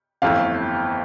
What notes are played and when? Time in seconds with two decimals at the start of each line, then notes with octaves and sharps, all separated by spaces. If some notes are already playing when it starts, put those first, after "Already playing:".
0.22 G1 F2 E3 A3 F5